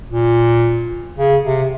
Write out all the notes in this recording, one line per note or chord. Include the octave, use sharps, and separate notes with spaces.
A#2
C#3
C3